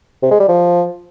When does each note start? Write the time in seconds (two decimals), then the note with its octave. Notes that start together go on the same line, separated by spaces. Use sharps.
0.22 C3
0.31 G#3
0.40 G3
0.49 F3